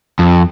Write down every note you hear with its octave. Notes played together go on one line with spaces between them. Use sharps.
F2